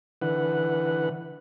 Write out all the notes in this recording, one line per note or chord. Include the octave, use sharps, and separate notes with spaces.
D3 E3 B4 F#5